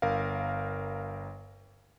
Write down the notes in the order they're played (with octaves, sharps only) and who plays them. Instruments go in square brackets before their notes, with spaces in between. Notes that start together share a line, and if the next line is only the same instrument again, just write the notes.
[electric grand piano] G1 A#4 F5